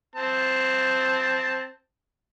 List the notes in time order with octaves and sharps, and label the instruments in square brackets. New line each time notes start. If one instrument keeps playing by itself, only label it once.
[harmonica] C4 A5